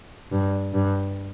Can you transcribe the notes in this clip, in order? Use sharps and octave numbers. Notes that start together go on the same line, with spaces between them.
G2
G2